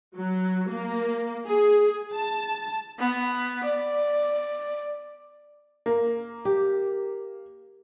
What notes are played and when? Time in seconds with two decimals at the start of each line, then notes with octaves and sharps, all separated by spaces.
0.16 F#3
0.69 A#3
1.47 G#4
2.14 A5
2.99 B3
3.63 D5
5.86 A#3
6.45 G4